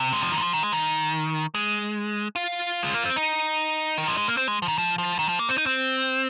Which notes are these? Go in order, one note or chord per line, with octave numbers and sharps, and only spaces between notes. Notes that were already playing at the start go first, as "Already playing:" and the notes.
Already playing: C3
G#3
F3
D#3
G#3
F3
D#3
G#3
D#3
G#3
F4
G#3
A#3
C4
D#4
D#3
F3
G#3
A#3
C4
G#3
F3
D#3
F3
F3
D#3
F3
A#3
C4
D#4
C4